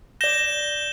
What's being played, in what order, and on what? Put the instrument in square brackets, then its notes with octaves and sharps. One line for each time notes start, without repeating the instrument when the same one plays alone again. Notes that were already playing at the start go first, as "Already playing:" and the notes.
[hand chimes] D5 A#6 [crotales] G6 E7 G7